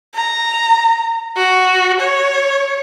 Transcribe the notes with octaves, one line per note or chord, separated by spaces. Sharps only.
A#5
F#4
C#5